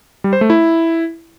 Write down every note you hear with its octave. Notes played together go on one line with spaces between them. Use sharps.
G3
C5
A3
E4